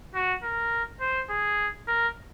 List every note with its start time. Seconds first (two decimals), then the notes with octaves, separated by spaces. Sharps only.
0.14 F#4
0.43 A#4
1.01 C5
1.30 G#4
1.87 A#4